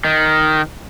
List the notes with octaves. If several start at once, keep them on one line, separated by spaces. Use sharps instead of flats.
D#3